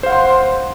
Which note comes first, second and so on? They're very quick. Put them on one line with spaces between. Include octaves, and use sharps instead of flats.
C5 F5 F#5 C6